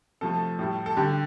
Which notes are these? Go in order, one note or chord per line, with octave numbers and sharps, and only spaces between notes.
C3 F3 A3 A4
A2 G3
A4
D3 G3 G4